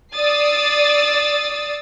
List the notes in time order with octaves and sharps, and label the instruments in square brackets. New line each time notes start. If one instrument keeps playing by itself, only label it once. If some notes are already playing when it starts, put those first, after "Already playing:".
[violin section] D5 D#6 E6 A6 C7